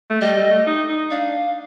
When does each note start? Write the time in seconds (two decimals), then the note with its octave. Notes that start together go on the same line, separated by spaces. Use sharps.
0.10 A3
0.21 G3 D#5
0.37 G3
0.51 A3
0.67 D#4
0.89 D#4
1.11 D4 F5